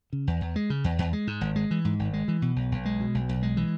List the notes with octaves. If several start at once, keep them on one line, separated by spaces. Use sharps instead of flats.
C#3
E2
E2
G#3
C#3
E2
E2
G#3
G#2
G#1
G#3
E3
G#2
G#1
G#3
E3
B2
B1
B1
G#3
B2
B1
B1
G#3
E3